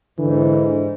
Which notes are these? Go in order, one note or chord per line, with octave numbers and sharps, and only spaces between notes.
G#2 D3 E3